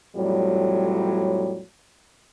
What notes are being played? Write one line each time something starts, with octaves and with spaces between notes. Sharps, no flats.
F2 A2 F#3 G3